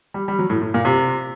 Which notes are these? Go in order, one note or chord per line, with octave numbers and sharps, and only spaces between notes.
G3
G3
F#3
A2
A2
A#2
C3